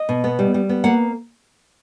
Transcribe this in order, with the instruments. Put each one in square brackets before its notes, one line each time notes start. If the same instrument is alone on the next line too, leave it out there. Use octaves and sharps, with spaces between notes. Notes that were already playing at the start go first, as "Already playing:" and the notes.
Already playing: [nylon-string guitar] D#5
B2
B3
G3
G3
B3
A#3 F#5